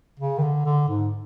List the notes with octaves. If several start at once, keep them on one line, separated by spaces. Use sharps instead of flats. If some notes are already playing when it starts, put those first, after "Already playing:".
C#3
D#3
D3
D3
G#2